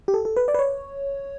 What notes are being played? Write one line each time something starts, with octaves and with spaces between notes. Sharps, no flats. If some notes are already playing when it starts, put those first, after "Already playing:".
G4
A4
A4
B4
D5
B4
C#5